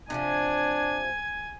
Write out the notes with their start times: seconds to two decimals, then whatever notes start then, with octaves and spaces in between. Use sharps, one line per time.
0.10 C3 D#3 F3 D4 G#5 G#6